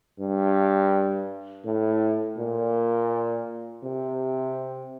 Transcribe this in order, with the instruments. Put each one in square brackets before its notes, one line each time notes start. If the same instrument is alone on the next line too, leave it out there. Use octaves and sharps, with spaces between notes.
[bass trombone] G2
A2
A#2
C3